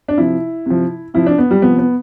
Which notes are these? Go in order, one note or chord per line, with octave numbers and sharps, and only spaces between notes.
D4
C3 F3 E4
C3 F3
C3 F3 E4
D4
B3
G3
C3 F3 B3
B3